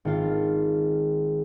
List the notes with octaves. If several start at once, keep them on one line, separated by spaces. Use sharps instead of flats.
G#1 F4